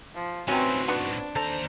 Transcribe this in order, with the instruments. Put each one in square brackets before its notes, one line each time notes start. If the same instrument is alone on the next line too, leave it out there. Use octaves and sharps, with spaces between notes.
[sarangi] F3
[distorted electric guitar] A2 D#4 [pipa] C3 C#4 [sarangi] C4 [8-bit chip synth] F#4 B4
[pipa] F3 B3 C#6 [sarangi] D4
[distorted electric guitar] D#2 A#5 [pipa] A4 [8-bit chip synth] C5